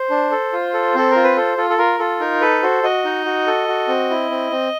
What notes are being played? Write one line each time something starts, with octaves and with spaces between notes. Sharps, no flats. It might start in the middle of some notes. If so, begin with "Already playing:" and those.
Already playing: C5
D4
A4
F4
A4
C4 A4
F4 A#4
B4
A4 C5
F4 A4
A4
F4 A#4
F4 A4
D#4 A#4
A4 B4
F#4 C5
F#4 D#5
D#4
F#4
A4
F#4
C4
E4
C4
C4